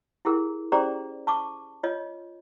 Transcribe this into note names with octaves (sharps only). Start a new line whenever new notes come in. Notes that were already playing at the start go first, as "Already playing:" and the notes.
E4 G4 G#4 A#4
C#4 G4 G#4 C5 D5 A#5
A5 C#6 D6
F4 C#5 D#5